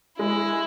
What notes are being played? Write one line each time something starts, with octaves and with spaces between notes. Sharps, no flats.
G#3 E4